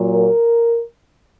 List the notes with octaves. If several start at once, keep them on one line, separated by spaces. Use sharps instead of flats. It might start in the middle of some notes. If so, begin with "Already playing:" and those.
Already playing: A#2 F#3
A#4